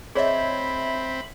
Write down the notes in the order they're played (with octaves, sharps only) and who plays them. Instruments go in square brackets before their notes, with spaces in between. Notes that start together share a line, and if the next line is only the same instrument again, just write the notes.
[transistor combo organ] C4 [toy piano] G#4 C#5 D#5 [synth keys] E5 G6 G#6 [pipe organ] B5